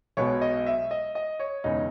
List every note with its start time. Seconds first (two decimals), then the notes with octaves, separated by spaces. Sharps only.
0.17 B1 B2 G#3 B3 C#5
0.41 D#5
0.67 E5
0.91 D#5
1.15 D#5
1.39 C#5
1.64 E1 E2 C#3 G#3 C#4 D#4